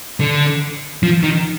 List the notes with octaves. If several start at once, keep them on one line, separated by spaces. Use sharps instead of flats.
D3
F3
D#3